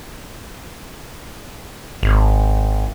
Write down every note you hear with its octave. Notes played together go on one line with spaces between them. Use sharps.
G#1